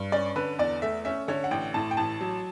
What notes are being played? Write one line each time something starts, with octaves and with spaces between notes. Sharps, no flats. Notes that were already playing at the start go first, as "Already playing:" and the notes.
Already playing: G2
C#4 D5
D3 B4
E2 D5
A3 E5
C#4 E5
D3 C#5
F#5
A1 G5
A2 A5
G5
A1 A5
F#3